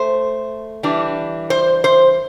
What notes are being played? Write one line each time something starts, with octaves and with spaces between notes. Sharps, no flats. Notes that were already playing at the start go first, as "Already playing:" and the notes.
Already playing: A3 C5
E3 G3 D4
C5
C5